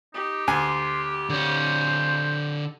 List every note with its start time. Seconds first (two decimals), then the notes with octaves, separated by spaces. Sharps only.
0.14 D#4 G4
0.47 D2 G#5 C6
1.29 D3 C5 C#5